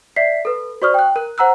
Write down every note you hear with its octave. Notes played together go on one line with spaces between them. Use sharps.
D5 E5 B6 C7
A4 B4
F#4 C5 D5 C#6 D#6 F6
G5 F#6
A#4 F#6
C5 F#5 A#5 E6 F#6